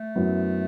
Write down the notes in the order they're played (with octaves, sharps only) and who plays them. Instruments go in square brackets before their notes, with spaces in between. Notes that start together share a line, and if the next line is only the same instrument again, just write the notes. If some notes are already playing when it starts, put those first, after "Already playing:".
Already playing: [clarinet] A3
[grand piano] F#2 F#3 B3 E4